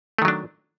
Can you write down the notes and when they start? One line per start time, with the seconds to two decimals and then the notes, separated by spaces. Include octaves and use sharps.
0.19 A3
0.22 D#3
0.25 F#3
0.28 D4